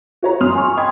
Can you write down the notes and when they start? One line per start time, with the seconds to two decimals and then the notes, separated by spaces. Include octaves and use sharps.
0.23 F#4 C#5 A#5
0.40 F#2 C6 D#6 F6 F7
0.56 G#5 C#6
0.77 D#5 G5 B5 C6 D#6 G#6